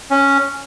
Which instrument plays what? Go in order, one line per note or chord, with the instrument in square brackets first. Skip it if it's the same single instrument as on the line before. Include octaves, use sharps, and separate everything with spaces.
[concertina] C#4